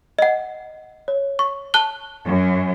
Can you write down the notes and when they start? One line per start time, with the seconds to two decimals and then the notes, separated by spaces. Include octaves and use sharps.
0.19 D#5 F#5
1.08 C#5
1.39 C#6
1.74 A5 F#6 G7
2.25 F#2